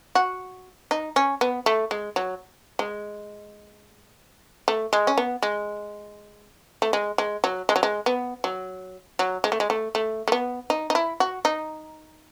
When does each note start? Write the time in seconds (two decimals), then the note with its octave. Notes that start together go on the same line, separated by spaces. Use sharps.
0.15 F#4
0.91 D#4
1.16 C#4
1.41 B3
1.66 A3
1.91 G#3
2.16 F#3
2.79 G#3
4.68 A3
4.93 G#3
5.07 C#4
5.18 B3
5.43 G#3
6.82 A3
6.93 G#3
7.18 G#3
7.44 F#3
7.69 G#3
7.76 F#3
7.83 G#3
8.06 B3
8.44 F#3
9.19 F#3
9.44 G#3
9.52 A3
9.60 G#3
9.70 A3
9.95 A3
10.28 A3
10.32 B3
10.70 D#4
10.90 D#4
10.95 E4
11.20 F#4
11.45 D#4